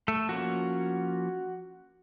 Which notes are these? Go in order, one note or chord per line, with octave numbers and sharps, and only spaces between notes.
A3 A4
F3 A#3 C#4 F#4